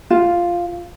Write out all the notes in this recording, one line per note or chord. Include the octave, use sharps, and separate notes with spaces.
F4